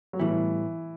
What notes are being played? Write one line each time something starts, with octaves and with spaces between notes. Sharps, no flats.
F#3
A2 E3 G3 B3